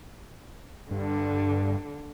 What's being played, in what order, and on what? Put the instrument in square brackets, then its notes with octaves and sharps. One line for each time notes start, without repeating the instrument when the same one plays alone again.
[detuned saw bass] G2 [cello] D3